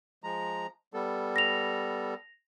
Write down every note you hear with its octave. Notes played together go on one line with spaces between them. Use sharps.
F3 G#3 A#5
G3 B3 A4
A#6 F7